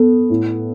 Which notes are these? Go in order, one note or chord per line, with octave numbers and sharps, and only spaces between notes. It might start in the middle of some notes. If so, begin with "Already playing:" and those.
Already playing: B3 A4
A2